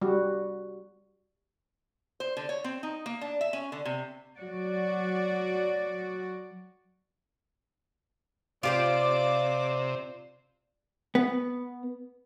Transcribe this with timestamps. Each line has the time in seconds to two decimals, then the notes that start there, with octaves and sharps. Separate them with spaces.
0.01 G3 F#4
2.20 C5
2.37 D3
2.49 C#5
2.64 C4
2.83 D#4
3.06 A#3
3.21 D4
3.41 E5
3.53 C#4
3.72 D3
3.85 C3
4.38 F#3 F#4 D5
8.63 C3 F4 G4 C5 D5 D6
11.15 B3